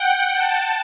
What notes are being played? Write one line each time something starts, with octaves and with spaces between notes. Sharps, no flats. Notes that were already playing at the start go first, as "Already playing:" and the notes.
Already playing: F#5 G5
A5